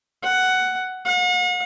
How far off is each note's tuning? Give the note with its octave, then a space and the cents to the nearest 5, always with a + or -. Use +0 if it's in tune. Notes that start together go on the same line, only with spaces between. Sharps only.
F#5 +10
F#5 -45